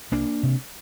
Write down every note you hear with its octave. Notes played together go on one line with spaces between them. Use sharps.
C2 A#3 D4
C3